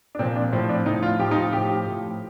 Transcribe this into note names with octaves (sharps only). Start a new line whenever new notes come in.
D4
A#2 F3 C4
D4
A2 F3 C4
D4
A2 F3 D#4
F4
A2 F3 G4
D#4
F4
A2 F3 G4
A2 F3